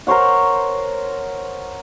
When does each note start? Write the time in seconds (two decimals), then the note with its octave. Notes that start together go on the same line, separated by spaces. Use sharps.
0.07 A#4 C5 C#5 F#5